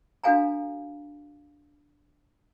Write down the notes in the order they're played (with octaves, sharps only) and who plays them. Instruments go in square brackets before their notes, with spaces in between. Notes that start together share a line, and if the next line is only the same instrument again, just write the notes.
[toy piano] D4 F#4 A4 F5 G#5 A#5